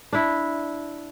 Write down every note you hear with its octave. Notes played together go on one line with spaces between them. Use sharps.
D4 E4